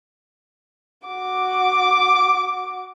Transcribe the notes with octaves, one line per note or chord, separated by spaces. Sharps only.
F#4 D6